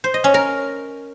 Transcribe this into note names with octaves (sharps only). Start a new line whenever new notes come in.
C5
D#5
C#4
A#4